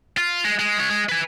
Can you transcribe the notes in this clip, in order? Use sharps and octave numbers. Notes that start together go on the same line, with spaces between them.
F4
G#3
G#3
G#3 C#5
G#3
B4 G#5